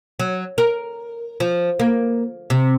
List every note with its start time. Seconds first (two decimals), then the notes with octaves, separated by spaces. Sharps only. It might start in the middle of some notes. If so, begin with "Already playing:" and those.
0.19 F#3
0.58 A#4
1.40 F3
1.80 A#3
2.50 C3